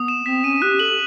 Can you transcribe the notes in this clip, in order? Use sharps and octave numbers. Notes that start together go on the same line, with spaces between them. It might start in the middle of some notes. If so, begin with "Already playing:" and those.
Already playing: B3 D#6
E7
C4 B6
C#4 D#7
G4 F#6
A4 F#7